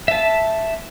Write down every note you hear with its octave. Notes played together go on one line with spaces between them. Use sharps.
E5 A5